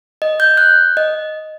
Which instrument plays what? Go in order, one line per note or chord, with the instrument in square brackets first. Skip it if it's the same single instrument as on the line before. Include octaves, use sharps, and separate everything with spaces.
[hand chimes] D#5
G6
F#6
D#5